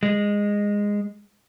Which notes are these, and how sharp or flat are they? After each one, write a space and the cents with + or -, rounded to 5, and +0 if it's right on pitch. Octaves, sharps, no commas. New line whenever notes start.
G#3 -15